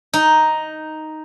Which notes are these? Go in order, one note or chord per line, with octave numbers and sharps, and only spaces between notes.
D#4